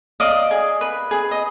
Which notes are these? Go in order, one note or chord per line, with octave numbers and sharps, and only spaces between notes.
D5 D#5 F5
G#4
B4
G#4
D#5